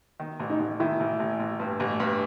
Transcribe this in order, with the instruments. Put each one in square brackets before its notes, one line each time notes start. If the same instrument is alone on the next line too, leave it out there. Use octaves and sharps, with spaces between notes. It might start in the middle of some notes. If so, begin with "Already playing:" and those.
[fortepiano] D#3
A1
[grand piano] D#4
[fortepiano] A1
[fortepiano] D#3 [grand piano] E4
[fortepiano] A1
A1
A1
G2
A1
G2